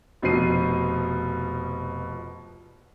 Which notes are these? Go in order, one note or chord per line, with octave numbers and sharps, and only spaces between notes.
F1 B2 F3 C5 C7 D#7